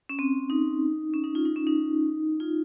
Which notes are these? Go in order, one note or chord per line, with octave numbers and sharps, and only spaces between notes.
C#4
C4
D#4
C#4
D#4
F4
D#4
C#4
D#4
F4